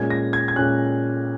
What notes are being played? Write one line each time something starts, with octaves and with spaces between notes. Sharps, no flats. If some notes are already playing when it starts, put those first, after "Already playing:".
Already playing: A#2 G#3 C#4 G#6
A#6
G#6
G#6
A#2 G#3 C#4 F#6